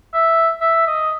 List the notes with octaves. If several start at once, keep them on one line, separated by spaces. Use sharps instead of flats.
E5
E5
D#5